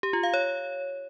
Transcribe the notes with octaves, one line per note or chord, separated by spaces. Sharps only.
G4
F4
F5
C#5